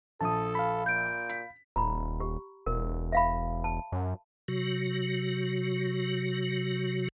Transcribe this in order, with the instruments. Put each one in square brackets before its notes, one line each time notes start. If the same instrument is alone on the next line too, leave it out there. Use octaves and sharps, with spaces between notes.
[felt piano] A#1 F3 [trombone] A4 [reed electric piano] A5 D#6
[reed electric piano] F5 B5
[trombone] A#2 [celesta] G6 D7
[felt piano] B6
[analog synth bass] D#1 [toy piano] A#5 B5
[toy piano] G4
[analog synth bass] E1 [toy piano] A#4
[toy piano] E5 F5 B5
A5
[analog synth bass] F#2
[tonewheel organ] C3 F#3 F#4